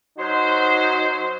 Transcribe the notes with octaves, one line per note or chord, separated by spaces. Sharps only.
F#3 D#4 F#4 C5